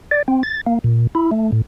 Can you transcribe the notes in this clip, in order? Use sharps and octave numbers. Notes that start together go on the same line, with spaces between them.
D5
C4
A6
A#3
A#2
E4
A3
A2